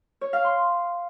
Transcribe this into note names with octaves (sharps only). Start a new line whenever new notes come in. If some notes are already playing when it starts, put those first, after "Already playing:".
C#5
F5
C6